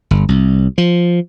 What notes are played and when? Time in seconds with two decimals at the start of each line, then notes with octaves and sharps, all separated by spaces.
0.11 G1
0.29 C2
0.78 F3